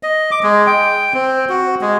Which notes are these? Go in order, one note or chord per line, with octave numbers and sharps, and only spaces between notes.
D#5
D6
G#3
G5
C4
F#4
G#3